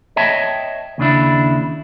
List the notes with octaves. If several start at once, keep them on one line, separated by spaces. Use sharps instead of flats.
C#5 D#5 E5 G5 A5
D#2 C#3 D4 E4